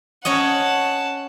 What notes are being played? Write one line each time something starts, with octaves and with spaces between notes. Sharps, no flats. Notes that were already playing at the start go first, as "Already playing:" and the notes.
C#4 C#5 D#5 F#5 A5